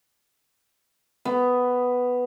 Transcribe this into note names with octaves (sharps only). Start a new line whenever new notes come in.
B3